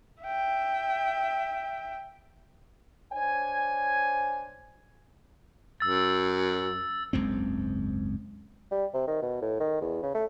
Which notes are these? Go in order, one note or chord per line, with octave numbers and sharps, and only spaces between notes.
E5 G5
D4 C5 C#5 G#5
F#2 E6 A6
F#1 C#2 G#2 C4
G3
C3
D#3
B2
A2
D#3
E2
C#3
A3